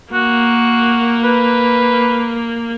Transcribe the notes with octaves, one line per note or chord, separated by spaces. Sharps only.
A#3 F#4
B4